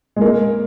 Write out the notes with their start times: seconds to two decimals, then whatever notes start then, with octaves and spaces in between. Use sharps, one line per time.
0.16 G#3
0.21 A#3